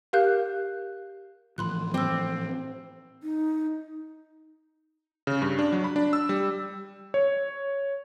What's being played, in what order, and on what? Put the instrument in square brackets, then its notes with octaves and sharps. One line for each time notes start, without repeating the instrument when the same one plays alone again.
[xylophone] G4 A#4 F5 F#6 G6
[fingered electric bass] A2 E3 F3 [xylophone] B5 C6 F#6
[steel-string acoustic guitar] C4 [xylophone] D6 E6
[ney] D#4
[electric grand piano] C#3
G2
D4
F#3
B5
D4
E6
G3
C#5